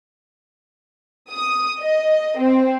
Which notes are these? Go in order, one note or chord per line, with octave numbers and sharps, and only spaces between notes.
D#6
D#5
C4